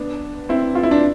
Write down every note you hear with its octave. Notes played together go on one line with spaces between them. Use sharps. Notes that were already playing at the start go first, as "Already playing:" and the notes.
Already playing: B3 D4
C4 E4
F4
E4
D4